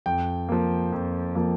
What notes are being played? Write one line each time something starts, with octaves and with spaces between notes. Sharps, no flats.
F2 G5
F3 A#3
F2
F3 A#3